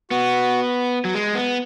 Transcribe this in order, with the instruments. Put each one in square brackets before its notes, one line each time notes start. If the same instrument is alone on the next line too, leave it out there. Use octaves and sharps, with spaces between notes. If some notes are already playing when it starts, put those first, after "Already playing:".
[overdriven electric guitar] B3 [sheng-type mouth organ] F#4
[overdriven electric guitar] F#3
G#3
B3